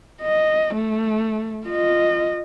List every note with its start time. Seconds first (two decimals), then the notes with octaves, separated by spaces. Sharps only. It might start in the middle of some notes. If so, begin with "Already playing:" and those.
0.22 D#5
0.74 A3
1.67 F4 D#5